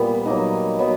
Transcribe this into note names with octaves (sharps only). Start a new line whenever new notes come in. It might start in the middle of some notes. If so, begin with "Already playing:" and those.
Already playing: A#2 G3 B3
F#3 A#3 D#4
F#3 B3 D#4 F#4